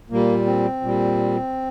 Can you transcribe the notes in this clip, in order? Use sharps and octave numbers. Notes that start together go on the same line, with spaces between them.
A#2 G3 A#3
C4
A#2 G3